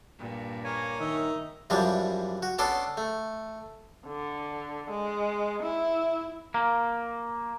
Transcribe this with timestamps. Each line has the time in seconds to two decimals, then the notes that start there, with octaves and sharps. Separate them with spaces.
0.19 G2 A#2
0.64 A#3 C#5 G#5
1.00 D#3 D#4 E5
1.70 F#2 E3 F3 G3 D4
2.43 F#4
2.59 B3 C#4 D4 A4 C6 D6
2.97 A3
4.07 D3
4.90 G#3
5.63 E4
6.54 A#3